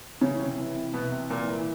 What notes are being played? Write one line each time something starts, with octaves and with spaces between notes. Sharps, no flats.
C#3 E3 C#4
C3
E3
C3
B2 E3 B3
C3
A#2 E3 A#3
E3